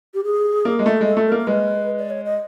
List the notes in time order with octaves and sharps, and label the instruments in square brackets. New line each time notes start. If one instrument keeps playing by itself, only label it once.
[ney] G4
G#4
[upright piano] A#3
G#3
A3
G#3
[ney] A4
[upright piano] A3
[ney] A#4
[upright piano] A#3
[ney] A#4
[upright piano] G#3 [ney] B4
[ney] D5
C#5
D#5